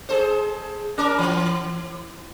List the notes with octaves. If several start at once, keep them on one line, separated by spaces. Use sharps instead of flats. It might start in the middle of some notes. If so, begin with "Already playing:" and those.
G#4 A4 C5
C#4 A#4
E3